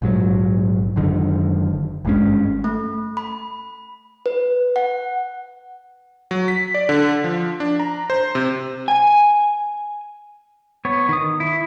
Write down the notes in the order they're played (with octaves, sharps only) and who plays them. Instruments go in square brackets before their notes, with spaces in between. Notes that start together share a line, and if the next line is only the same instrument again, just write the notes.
[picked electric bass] A#1 G#2 F#3
F#1 F#2 D3 D#3
G#1 G2 G#3 C#4
[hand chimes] A3
B5
B4
F#5
[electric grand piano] F#3
B6
D5
D3
F3
D4
A#5
C5
C3
[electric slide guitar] G#5
[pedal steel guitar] B3 C#5
D#3 D#6
E4